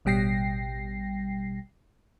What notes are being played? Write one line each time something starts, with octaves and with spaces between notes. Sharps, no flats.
A1 B2 G3 G5 A#6 C7